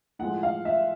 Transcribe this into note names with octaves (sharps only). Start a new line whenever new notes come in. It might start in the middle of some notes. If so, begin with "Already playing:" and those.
A2 F3 G#3 F#5
F5
E5